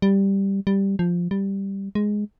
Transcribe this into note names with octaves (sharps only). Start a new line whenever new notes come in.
G3
G3
F3
G3
G#3